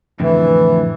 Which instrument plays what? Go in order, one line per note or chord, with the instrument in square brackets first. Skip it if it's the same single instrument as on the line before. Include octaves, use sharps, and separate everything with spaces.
[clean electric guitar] F2 A2 D3 [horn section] E3